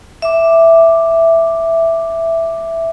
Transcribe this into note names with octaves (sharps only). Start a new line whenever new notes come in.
E5 D6